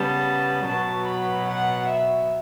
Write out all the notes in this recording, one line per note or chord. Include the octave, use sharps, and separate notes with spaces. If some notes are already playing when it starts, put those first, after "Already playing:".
Already playing: C#3 G3 B3 A5
B2 F#3 B3 A5
B5
F#5
E5